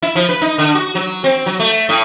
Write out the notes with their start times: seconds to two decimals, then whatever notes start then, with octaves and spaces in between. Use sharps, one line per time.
0.03 E4
0.16 F3
0.29 B4
0.42 D#4
0.58 D3
0.75 F#4
0.95 F#3
1.24 C4
1.46 F#3
1.60 A3
1.89 A2